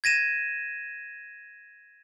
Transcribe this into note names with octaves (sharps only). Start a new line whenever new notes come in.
G#6 A#6 D#7 E7